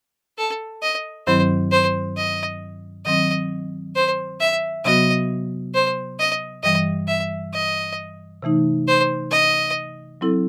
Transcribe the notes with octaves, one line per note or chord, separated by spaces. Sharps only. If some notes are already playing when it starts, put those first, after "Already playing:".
A4
D#5
G2 D#3 F#3 C4 E4 C5
C5
D#5
D#3 F#3 C4 D#5
C5
E5
C3 F#3 B3 F#4 D#5
C5
D#5
G2 E3 G3 D#5
E5
D#5
C3 E3 A3 D#4
C5
D#5
F#3 C4 E4 A4